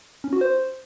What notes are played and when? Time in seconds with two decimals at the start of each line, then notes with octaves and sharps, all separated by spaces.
0.24 C#4
0.33 F#4
0.41 C5